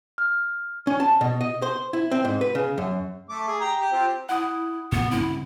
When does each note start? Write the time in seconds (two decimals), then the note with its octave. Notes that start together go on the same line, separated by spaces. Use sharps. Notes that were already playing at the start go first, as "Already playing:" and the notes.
0.18 F6
0.87 C#4
1.00 A5
1.21 B2
1.41 D#5
1.62 C5
1.93 E4
2.11 C4
2.25 G#2
2.41 B4
2.55 C#3
2.78 F#2
3.29 A3 D6
3.47 G#4
3.60 G4 G5 A#5
3.80 G4
3.92 C4 F4 G4
4.29 E4 F#5 D#6
4.92 A2 B3
5.11 G2 C#3 C4 E4